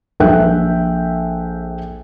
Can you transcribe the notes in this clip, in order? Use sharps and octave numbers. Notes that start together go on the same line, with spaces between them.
A#1 A4 E5 G5 F#6